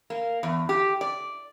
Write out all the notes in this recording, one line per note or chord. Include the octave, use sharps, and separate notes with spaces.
A#3
E2
G4
D5